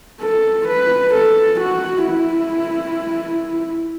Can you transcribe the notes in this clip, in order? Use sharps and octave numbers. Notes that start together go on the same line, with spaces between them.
A4
B4
A4
F#4
E4